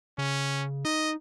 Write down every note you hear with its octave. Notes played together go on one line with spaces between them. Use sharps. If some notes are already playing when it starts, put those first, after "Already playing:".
C#3 C#4
D#4 D#5